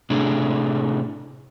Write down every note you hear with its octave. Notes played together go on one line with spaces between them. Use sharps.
A2 C3 A3 D4 G#4